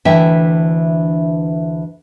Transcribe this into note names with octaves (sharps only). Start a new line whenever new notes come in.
D2 E3 D4 E5 G5